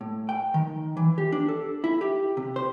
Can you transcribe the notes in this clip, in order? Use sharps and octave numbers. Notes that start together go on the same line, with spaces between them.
A2
G5
D#3
E3
G4
D4
A4
E4
G4
C3
C5